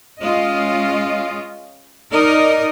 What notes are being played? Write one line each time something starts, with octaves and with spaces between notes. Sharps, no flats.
G#3 C#4 F4 D#5
D#4 A#4 D5 D#5